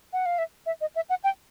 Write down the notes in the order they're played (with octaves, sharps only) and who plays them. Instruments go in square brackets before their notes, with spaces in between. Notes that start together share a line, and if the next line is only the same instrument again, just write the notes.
[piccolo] F#5
F5
E5
E5
D#5
E5
F#5
G5